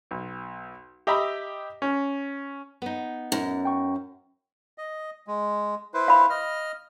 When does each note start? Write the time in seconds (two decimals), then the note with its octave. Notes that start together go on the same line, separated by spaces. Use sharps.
0.11 B1
1.07 G4 D#5 E5 A#5 B5
1.82 C#4
2.82 B3 D#4
3.32 F#2
3.65 G5 C#6
4.78 D#5
5.27 G#3
5.94 E4 B4 C5
6.08 F5 B5
6.30 D#5 F6